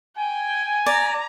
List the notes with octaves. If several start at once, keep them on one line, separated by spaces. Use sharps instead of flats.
G5 G#5
D5 A#5